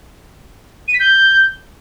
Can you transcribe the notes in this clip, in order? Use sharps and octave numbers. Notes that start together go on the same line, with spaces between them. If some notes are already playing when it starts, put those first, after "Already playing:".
D#7
B6
G6